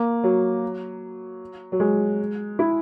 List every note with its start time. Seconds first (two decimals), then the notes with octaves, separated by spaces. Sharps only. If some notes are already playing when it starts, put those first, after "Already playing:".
Already playing: A#3
0.23 F#3
1.72 F#3
1.80 G#3
2.59 E4